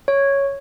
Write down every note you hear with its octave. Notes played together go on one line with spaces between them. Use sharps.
C#5